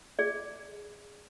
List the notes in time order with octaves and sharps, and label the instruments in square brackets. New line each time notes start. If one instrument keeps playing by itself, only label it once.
[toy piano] G#4 D5